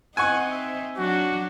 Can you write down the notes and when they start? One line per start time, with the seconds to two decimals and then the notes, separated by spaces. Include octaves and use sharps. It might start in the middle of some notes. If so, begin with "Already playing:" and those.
0.17 C4 D#4 F#5 G#5 C#6
0.50 E5
0.98 F#3 D4 F#4